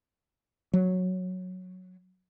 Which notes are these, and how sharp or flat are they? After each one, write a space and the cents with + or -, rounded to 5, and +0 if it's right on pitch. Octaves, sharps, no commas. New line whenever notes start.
F#3 -10